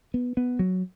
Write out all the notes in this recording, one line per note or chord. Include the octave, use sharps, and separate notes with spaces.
B3
B3
F#3